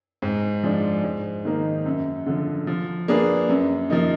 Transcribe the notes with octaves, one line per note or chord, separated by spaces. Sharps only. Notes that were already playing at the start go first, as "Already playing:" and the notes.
G#2
F3 G#3 D4
G#2
D#3 A#3 D#4
F#2
D3 F3
F3
A#3 D4 G#4 B4
F#2
F3 A#3 D#4